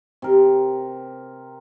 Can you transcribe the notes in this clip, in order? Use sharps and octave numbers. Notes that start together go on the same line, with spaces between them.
C3 A#4